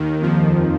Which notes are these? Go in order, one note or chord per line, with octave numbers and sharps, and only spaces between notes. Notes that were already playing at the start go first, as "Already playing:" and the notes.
Already playing: D#2 D#3
F2 F3